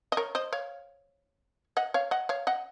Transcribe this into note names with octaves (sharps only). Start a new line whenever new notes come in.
D#5
A#4 C#5
C5 D#5
C#5 F5
D#5 F#5
C#5 F5
D#5 F#5
C#5 F5
D#5 F#5